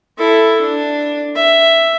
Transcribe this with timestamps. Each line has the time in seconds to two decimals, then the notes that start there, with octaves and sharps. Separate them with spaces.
0.18 E4 A4
0.61 D4
1.36 E5